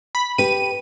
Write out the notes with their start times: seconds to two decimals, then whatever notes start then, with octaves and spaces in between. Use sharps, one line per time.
0.15 B5
0.38 G4 B4 D#7